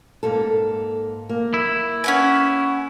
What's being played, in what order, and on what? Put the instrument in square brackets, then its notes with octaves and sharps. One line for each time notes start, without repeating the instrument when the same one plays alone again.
[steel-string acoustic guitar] G#2 A#3 A4
A#3
[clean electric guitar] E4
[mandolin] C#4 F#5 G#5